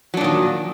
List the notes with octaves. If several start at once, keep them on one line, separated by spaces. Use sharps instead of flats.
A#2 D#3 F#3 D4